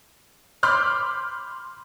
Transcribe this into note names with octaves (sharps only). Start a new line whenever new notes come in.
B5 C6 D6 F6 G6